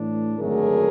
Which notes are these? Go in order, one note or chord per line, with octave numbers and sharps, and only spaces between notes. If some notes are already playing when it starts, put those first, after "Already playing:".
Already playing: A2 E3 A3 D4
G#1 F#2 D3 F#3 A3 G#4 A#4